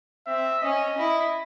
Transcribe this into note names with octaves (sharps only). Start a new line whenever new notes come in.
C4 E5
C#4 D#5
E4